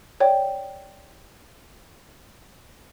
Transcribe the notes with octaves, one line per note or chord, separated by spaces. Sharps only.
C#5 D5 G5